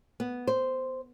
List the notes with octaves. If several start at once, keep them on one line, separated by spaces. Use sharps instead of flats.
B3
C5